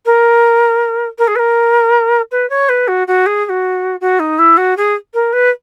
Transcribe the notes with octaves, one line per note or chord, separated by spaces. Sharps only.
A#4
A#4
G#4
B4
A#4
B4
C#5
B4
F#4
F#4
G#4
G#4
F#4
F#4
D#4
E4
F#4
G#4
A#4
B4